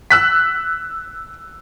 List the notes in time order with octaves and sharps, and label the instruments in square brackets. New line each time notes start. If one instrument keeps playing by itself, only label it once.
[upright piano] E6 F#6 B6